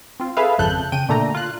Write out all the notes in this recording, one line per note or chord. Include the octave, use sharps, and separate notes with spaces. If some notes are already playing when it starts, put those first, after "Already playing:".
C4 F4
G#4 A4 B4 E5 F5
G#1 F2 C#3 A4 F#6 G6
C#3 G5 D#7
A#2 D3 A3 D4 A#5
F4 F#6